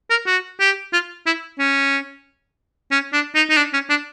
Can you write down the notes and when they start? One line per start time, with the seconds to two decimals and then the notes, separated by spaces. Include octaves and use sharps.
0.10 A#4
0.27 F#4
0.60 G4
0.93 F4
1.26 E4
1.59 C#4
2.91 C#4
3.13 D4
3.35 D#4
3.50 D#4
3.57 D4
3.73 C#4
3.90 D4